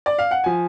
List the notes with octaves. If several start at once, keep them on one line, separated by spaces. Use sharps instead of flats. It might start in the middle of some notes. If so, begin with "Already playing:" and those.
D5
F5
F#5
F3 G#5